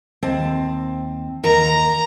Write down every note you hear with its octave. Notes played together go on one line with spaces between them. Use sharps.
D#2 C4 A5
D#2 A#4 A#5